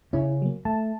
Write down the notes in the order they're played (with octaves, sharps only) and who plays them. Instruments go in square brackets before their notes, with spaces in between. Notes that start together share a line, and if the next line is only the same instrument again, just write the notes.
[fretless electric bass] C#3 C#4 [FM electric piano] E4
[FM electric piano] F#3 A#3
[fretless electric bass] A3 [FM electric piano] A5